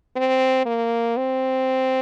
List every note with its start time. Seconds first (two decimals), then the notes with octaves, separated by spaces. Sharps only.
0.16 C4
0.66 A#3
1.17 C4